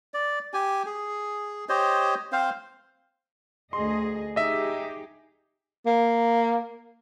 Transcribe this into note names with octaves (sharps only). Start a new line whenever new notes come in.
D5
G4 G#5
G#4
G4 C5 C#5 D#5
C4 C5 F5
D2 G#4 D#5 C6
D#4 G4 G#4 D#5 E5
A#3